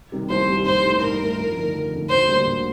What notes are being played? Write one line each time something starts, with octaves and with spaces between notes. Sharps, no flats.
C3 D#3 G3
C2 C5
C3 D#3 G3
G2 C5
D#3 A3 D#4
G2 A#4
D#3 A3 D#4
F2
D3 A3 D#4
F2
D3 A3 D#4
D2 C5
D3 G3 A#3 D4
D2